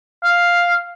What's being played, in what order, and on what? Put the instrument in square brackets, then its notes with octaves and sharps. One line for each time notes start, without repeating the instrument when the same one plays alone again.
[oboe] F5